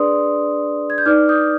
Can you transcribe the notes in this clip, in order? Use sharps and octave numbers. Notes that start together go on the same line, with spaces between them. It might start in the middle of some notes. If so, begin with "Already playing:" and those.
Already playing: D4 G#4 B4 D5 C6 D#6
G#6
G6
D#4 B4 D5 D6 F6
D#6 G6